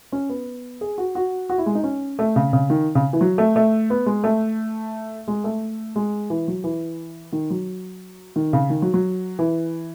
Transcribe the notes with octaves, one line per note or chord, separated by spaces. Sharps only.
C#4
B3
G#4
F#4
F#4
F#4
E4
G#3
D#4
C#4
A3
C#3
C#3
D#3
C#3
E3
F#3
A3
A3
B3
G#3
A3
G#3
A3
G#3
E3
F#3
E3
D#3
F#3
D#3
C#3
D#3
F#3
F#3
E3